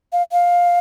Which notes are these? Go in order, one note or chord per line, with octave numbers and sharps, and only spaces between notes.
F5
F5